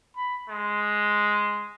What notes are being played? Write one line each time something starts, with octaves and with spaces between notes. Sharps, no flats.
B5
G#3